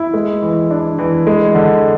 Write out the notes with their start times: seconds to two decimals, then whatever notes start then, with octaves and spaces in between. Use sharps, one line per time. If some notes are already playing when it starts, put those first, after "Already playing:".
Already playing: E4
0.14 G#3
0.42 E3
0.71 D4
0.98 E3
1.27 G#3
1.55 D3